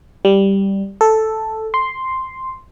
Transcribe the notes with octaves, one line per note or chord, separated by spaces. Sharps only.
G3
A4
C6